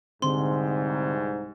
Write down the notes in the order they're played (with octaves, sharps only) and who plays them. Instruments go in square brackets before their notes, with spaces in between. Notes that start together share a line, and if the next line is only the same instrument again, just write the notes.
[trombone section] C2 G#2 [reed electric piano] D3 C4 [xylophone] C6